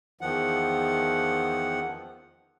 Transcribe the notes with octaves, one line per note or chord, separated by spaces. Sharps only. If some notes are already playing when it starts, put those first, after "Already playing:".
E2 D#3 F3 F#5